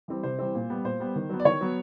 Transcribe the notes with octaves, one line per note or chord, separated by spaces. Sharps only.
E3 G3 C4
C3 C5
E3 G3 C4
A#2
G3 B3
A#2 C5
G3 B3
D#3
F#3 B3
D5
D#3 C#5
F#3 B3